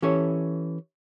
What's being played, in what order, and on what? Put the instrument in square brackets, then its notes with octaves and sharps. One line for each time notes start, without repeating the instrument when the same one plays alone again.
[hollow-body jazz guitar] E3 C#4 G4 A4 C#5